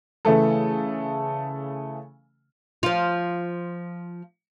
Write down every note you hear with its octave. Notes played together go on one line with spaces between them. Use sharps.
C#3 E3 A3 A4
F3 F4